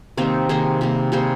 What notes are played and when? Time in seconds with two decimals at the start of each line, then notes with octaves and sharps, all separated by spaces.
0.17 C3 D#3 A#3 C4 D#4
0.49 C3 D#3 A#3 G#4 C5
0.81 C3 G3 A#3
1.12 C3 G3 A#3 G#4 C5